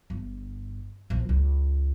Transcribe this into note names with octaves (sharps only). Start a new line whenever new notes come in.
G1
A#1
C#2